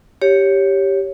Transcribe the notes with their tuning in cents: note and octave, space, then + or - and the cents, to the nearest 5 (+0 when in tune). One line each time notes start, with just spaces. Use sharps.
G4 +0 C#5 +0